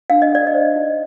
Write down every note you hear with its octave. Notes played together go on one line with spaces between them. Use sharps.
D4 F5
D#5
A4 D5
D#5
C5
D#4